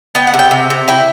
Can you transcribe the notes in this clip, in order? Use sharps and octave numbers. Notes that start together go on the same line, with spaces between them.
B3 G5
F#5
C3
G5
C3
C3
E4 G5